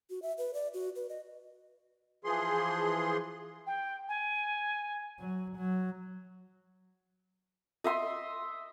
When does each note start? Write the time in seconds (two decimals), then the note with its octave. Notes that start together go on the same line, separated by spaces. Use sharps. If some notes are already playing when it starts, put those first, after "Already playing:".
0.10 F#4
0.22 E5
0.38 B4
0.54 D5
0.74 F#4
0.96 B4
1.09 D#5
2.24 E3 F3 G#4 C6
3.66 G5
4.08 G#5
5.19 F#3
5.57 F#3
7.84 D#5 E5 C6